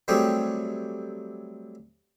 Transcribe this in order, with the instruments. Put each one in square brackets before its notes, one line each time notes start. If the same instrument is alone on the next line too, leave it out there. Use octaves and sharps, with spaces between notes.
[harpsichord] F#3 G3 A3 C4 G4 G#4